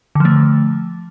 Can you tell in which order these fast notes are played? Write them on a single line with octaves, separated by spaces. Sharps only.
D3 F3 A3